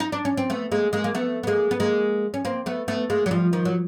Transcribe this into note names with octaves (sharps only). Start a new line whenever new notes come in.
D#4
D4
C#4
C4
A3 B3
G#3 A#3
G#3 A#3
A#3
A3 B3
B3
G#3 A#3
B3
G#3 A#3
C#4
A#3 C4
A3 B3
A3 B3
G#3 A#3
F#3
F3 G3
D#3 F3
F#3